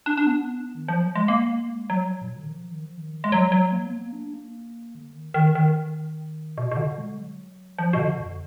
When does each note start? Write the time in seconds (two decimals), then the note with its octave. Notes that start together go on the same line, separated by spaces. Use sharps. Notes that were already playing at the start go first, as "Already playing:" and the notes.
0.06 D4
0.17 D4
0.27 B3
0.75 D#3
0.88 F3
1.02 F#3
1.15 G#3
1.28 A#3
1.70 G#3
1.90 F#3
2.22 A#2
2.29 B2
2.37 D3
2.43 D#3
2.51 F3
2.71 D#3
2.85 F3
2.98 D#3
3.24 G#3
3.32 F#3
3.52 F#3
3.72 A#3
3.87 B3
3.93 A#3
4.13 D4
4.34 A#3
4.95 D3
5.15 D#3
5.34 D#3
5.55 D#3
6.58 B2
6.72 B2
6.77 D3
6.98 G#3
7.18 F#3
7.78 F3
7.93 B2
7.99 D3
8.20 F2